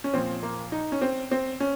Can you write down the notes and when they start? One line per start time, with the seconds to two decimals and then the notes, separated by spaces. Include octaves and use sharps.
0.04 C#4
0.13 A#2 F3 C4
0.43 A#3
0.72 D#4
0.92 C#4
1.01 C4
1.31 C4
1.60 C#4